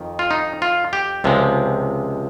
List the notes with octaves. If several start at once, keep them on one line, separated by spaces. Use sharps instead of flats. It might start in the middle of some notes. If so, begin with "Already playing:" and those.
Already playing: F2 D#3
F4
D#4
F4
G4
C#2 C3 F3 G#3